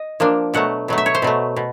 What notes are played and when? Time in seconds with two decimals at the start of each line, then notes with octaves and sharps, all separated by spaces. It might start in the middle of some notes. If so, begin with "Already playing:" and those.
Already playing: D#5
0.20 F3 A#3 D4
0.54 B2 F#3 A3 F#5
0.88 B2 F#3 A3
0.98 E5
1.06 C#5
1.15 C5
1.22 B2 F#3 A3
1.56 B2